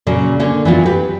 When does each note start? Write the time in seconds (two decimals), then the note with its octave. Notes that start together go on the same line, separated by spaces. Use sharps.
0.07 A#2 C#3 F#3
0.40 D3 A#3 C#4
0.65 E3 F#3 B3 F4
0.85 G4 B4